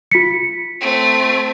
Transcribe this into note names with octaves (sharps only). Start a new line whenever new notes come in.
F4 B6 C#7
A3 C4